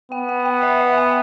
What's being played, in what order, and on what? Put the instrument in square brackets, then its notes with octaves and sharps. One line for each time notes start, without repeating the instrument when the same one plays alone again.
[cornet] B3 [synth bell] G5
[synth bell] G5
G5
E5
E5
G#5